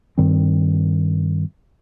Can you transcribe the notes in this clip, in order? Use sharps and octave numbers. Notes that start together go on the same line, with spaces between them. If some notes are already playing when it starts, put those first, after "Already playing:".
G2 D#3 G3 C4